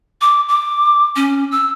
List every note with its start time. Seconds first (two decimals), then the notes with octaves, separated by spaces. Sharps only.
0.21 D6
0.48 D6
1.16 C#4
1.52 E6